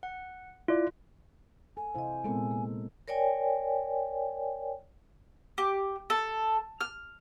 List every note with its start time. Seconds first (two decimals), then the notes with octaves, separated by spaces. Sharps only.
0.03 F#5
0.68 E4 F4 D5
1.77 A4 G#5
1.95 C3 E4 C5 D#5 F5
2.24 A#2 G#3 B3 C4 A4 A#4
2.51 A#3
3.08 A#4 C#5 D5 G5 G#5
5.58 G4
6.10 A4
6.81 F6